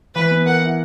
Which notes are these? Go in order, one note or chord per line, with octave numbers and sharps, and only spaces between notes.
E3 B4
B3
A#4 F#5
E4